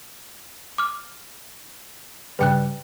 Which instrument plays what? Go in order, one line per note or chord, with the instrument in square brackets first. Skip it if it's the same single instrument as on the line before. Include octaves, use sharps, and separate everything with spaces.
[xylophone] D6 F6
[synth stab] G2 C#3 G3 [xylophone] B4 G5 F#6